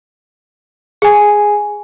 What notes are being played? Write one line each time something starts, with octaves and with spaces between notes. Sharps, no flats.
G#4 G#5